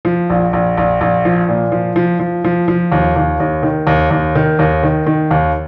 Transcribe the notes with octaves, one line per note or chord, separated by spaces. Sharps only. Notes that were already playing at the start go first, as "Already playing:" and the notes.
F3
A#1
A#1
A#1
A#1
F3
A#2
F3
F3
F3
F3
F3
D#2
D#2
D#2
D#3
D#2
D#2
D#3
D#2
D#3
D#3
D#2